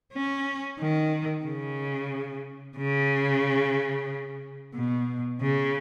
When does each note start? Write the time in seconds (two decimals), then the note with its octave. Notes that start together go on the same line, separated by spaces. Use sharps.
0.13 C#4
0.80 D#3
1.45 C#3
2.77 C#3
4.75 B2
5.41 C#3